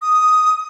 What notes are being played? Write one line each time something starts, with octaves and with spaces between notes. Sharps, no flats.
D#6